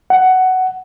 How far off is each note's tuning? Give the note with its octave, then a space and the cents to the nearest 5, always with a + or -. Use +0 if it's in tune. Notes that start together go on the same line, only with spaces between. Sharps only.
F#5 +10